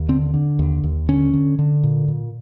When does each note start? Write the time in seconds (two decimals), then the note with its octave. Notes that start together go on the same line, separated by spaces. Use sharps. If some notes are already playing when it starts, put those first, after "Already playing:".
Already playing: D#2
0.09 D3 C4
0.34 D3
0.59 D#2
0.84 D#2
1.09 D3 C#4
1.34 D3
1.59 D3
1.83 A#2
2.08 A#2